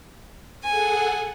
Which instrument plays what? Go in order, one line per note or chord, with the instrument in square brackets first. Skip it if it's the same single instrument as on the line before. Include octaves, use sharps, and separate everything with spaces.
[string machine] G#4 A4 F#5 [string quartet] G#5